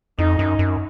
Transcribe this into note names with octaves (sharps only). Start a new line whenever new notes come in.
F2 D#4
F#2
F#2